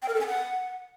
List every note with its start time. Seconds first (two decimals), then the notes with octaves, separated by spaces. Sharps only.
0.02 G5
0.08 A#4
0.14 A4
0.20 G#5
0.27 F#5